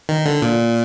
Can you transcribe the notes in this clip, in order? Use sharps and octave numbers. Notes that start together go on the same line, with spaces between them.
D#3
D3
A#2